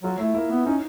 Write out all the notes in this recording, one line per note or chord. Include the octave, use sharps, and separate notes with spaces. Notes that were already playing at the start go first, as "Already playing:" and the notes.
F#3 F4
A3 E4
A#3 E4
B3
C#4 D#4